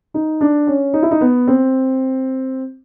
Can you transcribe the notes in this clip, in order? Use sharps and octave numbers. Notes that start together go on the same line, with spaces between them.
D#4
D4
C#4
D#4
E4
D#4
B3
C4